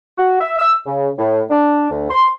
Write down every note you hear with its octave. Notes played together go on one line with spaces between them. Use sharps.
F#4
E5
E6
C#3
A2
D4
D2
C6